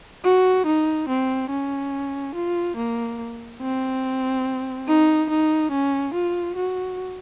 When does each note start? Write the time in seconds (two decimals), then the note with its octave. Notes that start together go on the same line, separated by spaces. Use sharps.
0.24 F#4
0.66 D#4
1.09 C4
1.51 C#4
2.35 F4
2.77 A#3
3.62 C4
4.88 D#4
5.30 D#4
5.72 C#4
6.14 F4
6.57 F#4